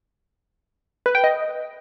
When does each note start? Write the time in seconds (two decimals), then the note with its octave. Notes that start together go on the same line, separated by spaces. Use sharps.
1.06 B4
1.15 G5
1.24 D#5